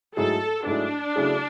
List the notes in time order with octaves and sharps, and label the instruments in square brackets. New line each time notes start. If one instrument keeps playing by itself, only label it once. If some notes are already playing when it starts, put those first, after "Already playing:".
[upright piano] G#2 F#3 A3 E4 G#4 [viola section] A4
[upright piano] G#2 F#3 A3 E4 G#4 [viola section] D4
[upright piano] C#3 F#3 A3 E4 G#4